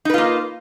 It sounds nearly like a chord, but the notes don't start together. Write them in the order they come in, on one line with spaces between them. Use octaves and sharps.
D#4 B4 F4 A#3